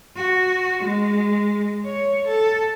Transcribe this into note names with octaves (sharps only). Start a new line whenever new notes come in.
F#4
G#3
C#5
A4